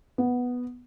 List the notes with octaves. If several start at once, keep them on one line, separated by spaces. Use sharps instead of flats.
B3